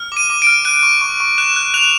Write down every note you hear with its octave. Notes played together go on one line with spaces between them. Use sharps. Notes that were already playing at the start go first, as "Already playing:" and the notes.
Already playing: F6
D6 D#7
D6
F6 D7
F#6 D#7
C#6
C#6
C#6
F#6 E7
F#6
F#6 F7